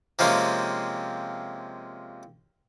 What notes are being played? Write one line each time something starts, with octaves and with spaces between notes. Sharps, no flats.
C3 F3 G#3 A#3 C4 C#4